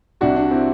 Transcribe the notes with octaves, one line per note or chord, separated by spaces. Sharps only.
C2 C3 G3 D4 F#4
D4
C4 E4